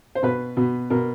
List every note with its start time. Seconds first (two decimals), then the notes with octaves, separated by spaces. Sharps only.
0.15 C5
0.23 B2 B4
0.57 B2
0.90 B2 A#4